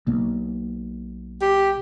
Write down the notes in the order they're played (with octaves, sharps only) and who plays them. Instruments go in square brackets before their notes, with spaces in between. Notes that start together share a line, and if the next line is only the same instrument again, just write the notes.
[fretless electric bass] B1 A#3 B3
[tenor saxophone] G4